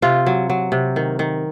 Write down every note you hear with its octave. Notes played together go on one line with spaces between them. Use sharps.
C3 F4
F#3
F#3
C3
D#3
D#3